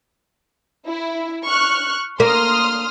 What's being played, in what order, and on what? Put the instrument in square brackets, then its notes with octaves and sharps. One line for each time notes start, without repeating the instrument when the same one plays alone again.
[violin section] E4
C#6 F6 F#6
[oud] A#3 [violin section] C6 D#6 F6